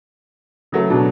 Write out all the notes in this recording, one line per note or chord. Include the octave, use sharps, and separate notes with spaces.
C#3 F#3 A3
B2 D4